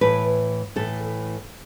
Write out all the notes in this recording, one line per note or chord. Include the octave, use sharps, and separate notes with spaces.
A2 E3 B4
A2 E3 A4